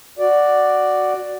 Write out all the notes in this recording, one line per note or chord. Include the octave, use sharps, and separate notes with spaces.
F#4 D5